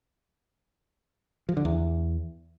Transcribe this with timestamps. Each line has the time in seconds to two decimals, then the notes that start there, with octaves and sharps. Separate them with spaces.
1.49 F3
1.57 D3
1.65 E2